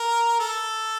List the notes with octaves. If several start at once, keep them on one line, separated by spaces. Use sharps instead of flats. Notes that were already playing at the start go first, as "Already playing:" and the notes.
Already playing: A#4
A4